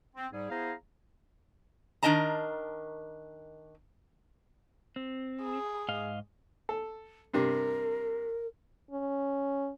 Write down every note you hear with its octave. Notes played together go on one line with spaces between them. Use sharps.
C4
G#2 G3 G#4
B3 E4 G#4 C5 F5 A#5
D#3 D4 A#4 D#5 A5 A#5
C4
G#4
G#2 D#5 F5
A4
G2 C3 A#4
C#4